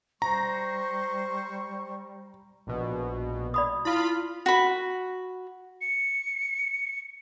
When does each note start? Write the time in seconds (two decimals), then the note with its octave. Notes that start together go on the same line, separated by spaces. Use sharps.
0.22 G3 C5 A#5 C#6
2.67 A#1 B2
3.54 D5 B5 D#6
3.85 E4 F4 B5
4.46 F#4 B5
5.81 C#7